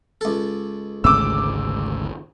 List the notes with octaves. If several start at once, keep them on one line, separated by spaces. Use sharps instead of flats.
C#2 A4
G#1 D2 G#2 C#3 A3 D6 E6